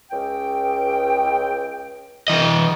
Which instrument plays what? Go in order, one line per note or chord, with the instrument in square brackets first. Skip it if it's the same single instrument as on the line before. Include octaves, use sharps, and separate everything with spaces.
[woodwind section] C#2 G5
[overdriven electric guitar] E3 D#5